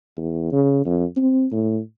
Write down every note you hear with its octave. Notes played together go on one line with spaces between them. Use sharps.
E2
C#3
F2
C4
A2